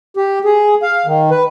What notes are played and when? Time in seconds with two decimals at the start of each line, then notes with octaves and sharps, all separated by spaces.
0.17 G4
0.45 G#4
0.83 F5
1.06 D#3
1.31 B4